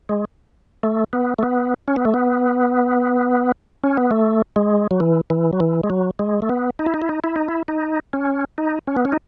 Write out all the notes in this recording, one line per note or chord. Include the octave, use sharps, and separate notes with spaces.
G#3
A3
B3
A3
B3
C#4
B3
A3
B3
C#4
B3
A3
G#3
F#3
E3
E3
F#3
E3
G#3
F#3
G#3
A3
B3
D#4
E4
D#4
E4
D#4
E4
D#4
E4
D#4
C#4
D#4
C#4
B3
C#4
D#4